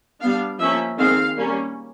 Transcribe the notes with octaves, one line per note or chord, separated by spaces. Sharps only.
G3 B3 D4 F5
F3 A#3 C#4 E5
D#3 G#3 C4 F5
G3 A#3 C#4